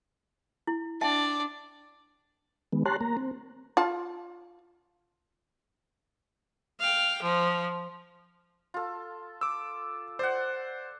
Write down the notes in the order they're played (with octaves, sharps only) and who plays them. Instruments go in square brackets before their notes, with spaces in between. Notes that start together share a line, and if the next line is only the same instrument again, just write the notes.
[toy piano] E4
[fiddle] D4 D5 [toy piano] E5 G5 A5
[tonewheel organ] D#3 G#3 B3
G4 C#5 A5 A#5 C6 F#6
A#3 A#5
C4
[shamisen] F4 A5
[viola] F5 G5
F3
[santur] F4 A4
[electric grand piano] D6 E6
[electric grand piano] C5 [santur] D5 F#5